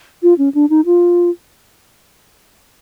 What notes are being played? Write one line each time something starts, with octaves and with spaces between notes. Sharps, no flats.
F4
C#4
D4
D#4
F4